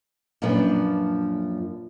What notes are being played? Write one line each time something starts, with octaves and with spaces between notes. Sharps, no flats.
F#2 A#2 F3 D4 B4